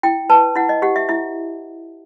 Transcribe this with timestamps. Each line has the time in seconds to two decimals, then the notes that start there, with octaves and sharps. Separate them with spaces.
0.03 E4 G5
0.30 B4 A5
0.55 E4 F#5
0.69 D#5
0.82 G4 F#5
0.96 E5
1.09 E4 E5